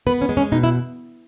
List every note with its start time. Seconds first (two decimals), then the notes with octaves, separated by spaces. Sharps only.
0.07 B3 B4
0.21 C#4
0.29 G#3
0.37 C#4
0.52 B2 D#4
0.63 E4